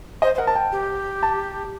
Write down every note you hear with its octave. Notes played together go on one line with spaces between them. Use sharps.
C5 D#5
C5
A#4 F#5
A5
G5
G4
A5